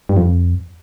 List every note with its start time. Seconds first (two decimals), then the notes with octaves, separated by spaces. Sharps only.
0.09 G2
0.17 F2